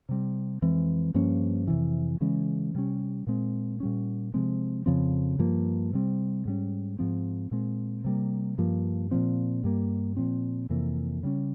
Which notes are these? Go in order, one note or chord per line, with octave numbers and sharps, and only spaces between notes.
C3 G3 C4
F2 E3 G#3 C4
G2 F3 A#3 C#4
F2 C3 E3
C#3 E3 G#3 C#4
C3 G3 C#4
A#2 G#3 C4
A#2 G3 C#4
C3 F3 G#3 C4
F2 C#3 F3 C4
G2 F3 A#3
C3 G3 C4
G#2 G3 C#4
G#2 F3 C4
A#2 G#3 C4
C3 G3 A#3
G2 F3 A#3
A#2 F3 C4
G2 G3 A#3
A#2 F3 C4
F2 C3 E3 A#3
C#3 G3 C#4